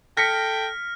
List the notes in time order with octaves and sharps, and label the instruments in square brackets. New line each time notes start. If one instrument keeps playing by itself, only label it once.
[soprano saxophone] A4 [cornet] G5 [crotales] F6 [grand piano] A#6 B6 C#7